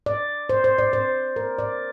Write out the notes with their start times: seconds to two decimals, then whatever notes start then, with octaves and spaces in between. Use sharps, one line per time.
0.06 D5
0.49 C5
0.64 C5
0.78 D5
0.93 C5
1.36 A#4
1.59 D5